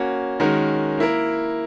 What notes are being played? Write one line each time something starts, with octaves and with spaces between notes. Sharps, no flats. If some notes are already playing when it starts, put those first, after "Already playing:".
Already playing: A#3 C#4 F#4
D#3 G#3 C#4 F#4 A#4
A#3 E4 A#4